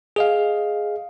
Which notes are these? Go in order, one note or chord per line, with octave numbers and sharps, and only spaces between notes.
G#4 D#5 F5